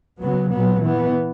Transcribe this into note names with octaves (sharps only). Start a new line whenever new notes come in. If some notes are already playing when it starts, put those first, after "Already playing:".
C#3 F#3 B3
A#2 F#3 B3
E3 B3